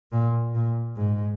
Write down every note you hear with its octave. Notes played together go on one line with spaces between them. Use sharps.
A#2
A#2
G#2